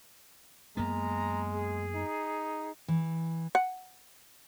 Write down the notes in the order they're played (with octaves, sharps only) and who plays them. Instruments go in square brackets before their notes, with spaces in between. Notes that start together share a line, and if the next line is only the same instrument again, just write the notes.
[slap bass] F#2 A#3 B3 [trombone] G#3 [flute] A#5
[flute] G#4
[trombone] D#4
[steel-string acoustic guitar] E3
[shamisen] F#5